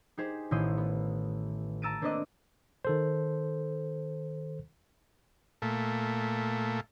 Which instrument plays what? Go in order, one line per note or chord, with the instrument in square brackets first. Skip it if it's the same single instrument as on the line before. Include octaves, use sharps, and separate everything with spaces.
[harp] D#4 G4 G#4 C5
A1 D#3 E4 C6 D#6 G6
B3
A5 A#5 E6 A6 D7 D#7
A#3 C4 D4 B4 D5 D#5
[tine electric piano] D#3 A4 C5
[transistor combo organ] A#2 A3